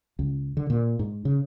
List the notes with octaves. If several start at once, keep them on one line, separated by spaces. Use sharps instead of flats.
C#2
D3
A#2
G#2
C#3